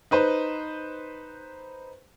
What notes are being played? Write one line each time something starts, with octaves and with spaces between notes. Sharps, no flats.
D#4 B4 C5